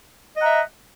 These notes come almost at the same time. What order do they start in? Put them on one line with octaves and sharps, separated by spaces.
D#5 F#5 A#5 E5